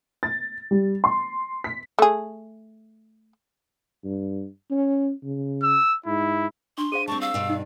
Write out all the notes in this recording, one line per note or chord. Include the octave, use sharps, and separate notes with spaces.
A6
G3
C6
B6
A3 G#4
G2
C#4
C#3
E6
G#2 E4
D4 C6 C#6
G#4 C5 F5 D#7
G3 C4 A5 C#6
F5 C#6 E6
G2 B2
D#4 D5